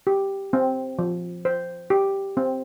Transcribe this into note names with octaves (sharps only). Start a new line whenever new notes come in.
G4
C4
F3
C5
G4
C4